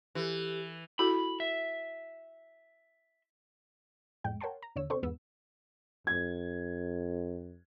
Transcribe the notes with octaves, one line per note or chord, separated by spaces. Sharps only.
E3 G4 A4
E4 F#4 A4 B5
E5
F2 A2 G#3 G5
A#4 C#5 F#5 G5 A5 C6
A#5
E2 D3 C#5 E6
C3 C4 D4 A4 C5 C#6
E2 G#2 B3 E6
F2 G#6